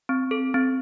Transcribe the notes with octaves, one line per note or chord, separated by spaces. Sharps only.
C4
A4
C4